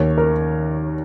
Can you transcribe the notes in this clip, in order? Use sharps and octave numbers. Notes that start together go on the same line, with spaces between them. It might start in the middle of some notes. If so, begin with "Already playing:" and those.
Already playing: D#2 D#3 C#5
A#4